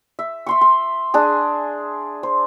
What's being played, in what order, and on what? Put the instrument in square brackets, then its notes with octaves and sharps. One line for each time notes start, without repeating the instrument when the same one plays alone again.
[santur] E5
E5 C6 C#6
C6
D4 G#4
C5